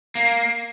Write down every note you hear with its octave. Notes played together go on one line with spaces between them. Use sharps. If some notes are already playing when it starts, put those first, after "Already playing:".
A#3